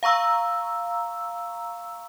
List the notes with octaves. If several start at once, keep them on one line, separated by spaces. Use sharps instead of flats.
F5 A#5 C#6 E6